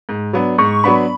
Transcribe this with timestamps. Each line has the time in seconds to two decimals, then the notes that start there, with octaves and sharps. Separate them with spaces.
0.09 G#2
0.33 F#3 B3 D4
0.58 G#2 C#6
0.84 F#3 B3 D4 B5